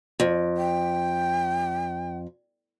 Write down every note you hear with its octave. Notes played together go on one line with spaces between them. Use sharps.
F2
G5